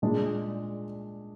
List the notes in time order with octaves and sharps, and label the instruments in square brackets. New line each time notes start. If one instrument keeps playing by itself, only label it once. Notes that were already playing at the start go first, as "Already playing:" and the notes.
[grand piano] A#2 G#3 D4